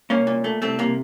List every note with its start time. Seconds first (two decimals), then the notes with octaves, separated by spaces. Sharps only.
0.10 C2 A#3 C#4
0.27 A#2
0.44 A3
0.62 C2 A3 C4
0.79 C3 A#3